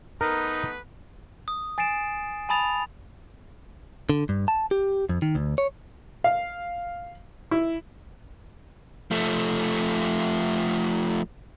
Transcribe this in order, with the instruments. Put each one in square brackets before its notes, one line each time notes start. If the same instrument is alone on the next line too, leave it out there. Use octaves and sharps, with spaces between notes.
[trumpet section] A3 B3 B4 [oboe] D#4 [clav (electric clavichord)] A#4
[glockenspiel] D#6
G#5 A6 C7 D7 E7
G#5 A5 B5 D#6 A6 F7
[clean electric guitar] D3
G2
A5
G4
F2
D#3
D2
C#5
[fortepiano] F5
E4
[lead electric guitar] F3 A3